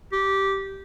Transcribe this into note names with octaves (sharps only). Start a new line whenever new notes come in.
G4